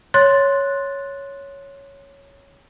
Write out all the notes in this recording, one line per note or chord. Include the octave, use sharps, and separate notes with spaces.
C#5 C6 F#6 A6